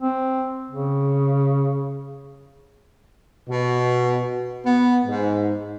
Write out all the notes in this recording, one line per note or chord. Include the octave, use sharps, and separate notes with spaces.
C4
C#3
B2
B3
G#2